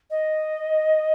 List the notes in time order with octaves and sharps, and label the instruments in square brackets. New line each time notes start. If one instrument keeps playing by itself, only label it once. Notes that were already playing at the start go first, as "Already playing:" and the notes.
[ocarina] D#5